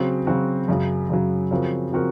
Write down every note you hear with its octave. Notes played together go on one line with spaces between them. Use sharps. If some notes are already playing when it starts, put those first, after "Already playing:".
Already playing: C#3 F#3 C4 F#4
C#3 F#3 C4 F#4
F#2 C#3 F#3
F#2 C#3 F#3
C#3 F3 C4 F#4 A#4
C#3 F3 C4 F#4 A#4